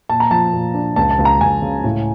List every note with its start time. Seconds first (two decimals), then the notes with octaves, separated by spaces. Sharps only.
0.09 A#2 A5
0.20 A#5
0.31 F3 A5
0.53 A#2
0.74 D4
0.96 C#2 A5
1.11 A5
1.19 C#2
1.25 A#5
1.41 C#2 G#5
1.62 C#3
1.84 A2